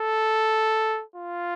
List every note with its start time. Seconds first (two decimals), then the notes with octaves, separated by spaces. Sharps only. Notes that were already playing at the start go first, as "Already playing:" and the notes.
Already playing: A4
1.16 F4